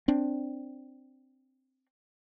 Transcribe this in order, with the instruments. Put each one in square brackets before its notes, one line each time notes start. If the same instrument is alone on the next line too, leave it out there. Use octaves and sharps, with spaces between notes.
[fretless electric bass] C4 D4